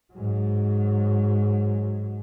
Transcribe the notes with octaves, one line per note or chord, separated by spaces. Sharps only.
G#2 F#3